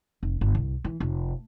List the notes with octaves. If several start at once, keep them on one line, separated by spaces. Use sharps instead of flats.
F1
G1
C2
E3
F1